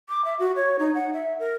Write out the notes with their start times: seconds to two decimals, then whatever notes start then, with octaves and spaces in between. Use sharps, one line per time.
0.09 D6
0.25 E5
0.39 F#4
0.56 C#5
0.79 D#4
0.94 F#5
1.13 E5
1.39 A#4